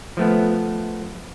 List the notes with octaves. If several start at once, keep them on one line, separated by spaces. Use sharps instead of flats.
F3 A3 B3